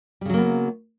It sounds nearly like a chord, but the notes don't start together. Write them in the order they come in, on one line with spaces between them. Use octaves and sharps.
G3 C#3 F#3 A#3 B3